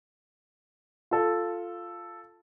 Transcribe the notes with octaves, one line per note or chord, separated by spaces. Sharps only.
F4 A4